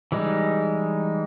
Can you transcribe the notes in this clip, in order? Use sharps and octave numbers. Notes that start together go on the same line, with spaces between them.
E3 G3 G#3 D#4